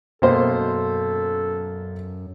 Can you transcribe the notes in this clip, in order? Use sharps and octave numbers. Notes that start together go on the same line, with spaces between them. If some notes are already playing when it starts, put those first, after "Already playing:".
F#2 B2 A#3 A4 C5